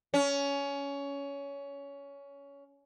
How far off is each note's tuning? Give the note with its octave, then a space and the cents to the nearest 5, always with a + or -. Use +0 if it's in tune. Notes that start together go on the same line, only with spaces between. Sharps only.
C#4 +20